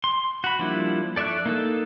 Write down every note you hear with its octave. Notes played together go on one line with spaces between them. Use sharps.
C6
F#4 B5
F3 G3 A#3 D4 E4
A4 D5 E5 C#6 F#6
A#3 D#4 A4